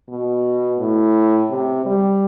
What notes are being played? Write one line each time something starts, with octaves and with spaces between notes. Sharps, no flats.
B2
A2
C3
G3